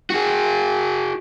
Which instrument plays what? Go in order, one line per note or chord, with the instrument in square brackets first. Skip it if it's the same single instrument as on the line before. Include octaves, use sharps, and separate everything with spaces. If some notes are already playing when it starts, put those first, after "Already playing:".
[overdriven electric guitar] F#4 G#4